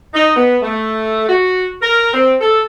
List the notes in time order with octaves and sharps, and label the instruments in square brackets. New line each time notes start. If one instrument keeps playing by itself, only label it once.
[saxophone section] D#4
B3
A3
F#4
A#4
C4
A4